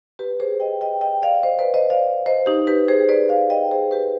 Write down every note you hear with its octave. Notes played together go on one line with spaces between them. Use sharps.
G4 B4
G#4 C5
D#5 G5
D#5 G5
D#5 G5
D5 F5
C5 D#5
B4 D5
C5 D#5
D5 F5
C5 D#5
D#4 G4
G4 B4
G#4 C5
B4 D5
D5 F5
D#5 G5
G#4 C5
G4 B4